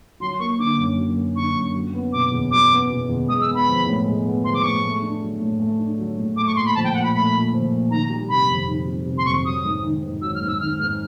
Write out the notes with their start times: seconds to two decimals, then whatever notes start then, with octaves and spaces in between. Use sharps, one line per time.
0.20 F#3 C6
0.39 A#3 C#6
0.59 D3 D6
0.78 F#2
0.97 F#3
1.17 A#3
1.36 D3 C#6
1.55 F#2
1.74 F#3
1.94 B3
2.13 B2 D6
2.32 E2
2.51 F#3 D6
2.70 B3
2.90 B2
3.09 E2
3.28 G#3 D#6
3.41 E6
3.47 B3
3.55 B5
3.67 F3
3.86 A2
4.05 G#3
4.24 B3
4.44 F3 C6
4.54 D6
4.63 A2 C#6
4.82 A3
5.02 D4
5.21 F#3
5.40 A2
5.59 A3
5.79 D4
5.98 F#3
6.18 A2
6.36 A3 D6
6.47 C#6
6.56 A#2 C6
6.66 B5
6.75 F3 A5
6.84 G5
6.94 A#2 F#5
7.03 B5
7.14 A3 B5
7.33 A#2
7.52 F3
7.72 A#2
7.90 D#3 A#5
8.10 G3
8.29 C3 B5
8.48 F2
8.67 D#3
8.87 G3
9.06 C3
9.18 C6
9.25 F2 C#6
9.44 F#3 D#6
9.64 G#2
9.83 D#3
10.03 G#2
10.21 F#3 E6
10.35 F6
10.41 G#2
10.47 E6
10.60 D#3 F6
10.80 G#2 F6